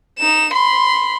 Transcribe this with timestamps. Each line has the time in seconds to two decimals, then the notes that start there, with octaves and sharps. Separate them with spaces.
0.19 D#4 E7
0.53 B5 C6